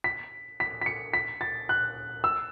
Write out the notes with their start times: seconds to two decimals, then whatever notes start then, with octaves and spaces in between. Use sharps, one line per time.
0.04 B6
0.60 B6
0.81 B6
0.86 C#7
1.14 B6
1.41 A6
1.69 F#6
2.24 E6